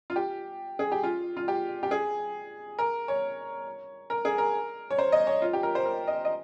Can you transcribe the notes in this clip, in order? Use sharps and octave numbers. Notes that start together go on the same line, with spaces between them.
F4
G4
G#4
G4
F4
F4
G4
G4
G#4
A#4
C#5
A#4
G#4
A#4
C#5
C5
D#5
C#5
F4
G4
A#4
C5
A#4
D#5
D#5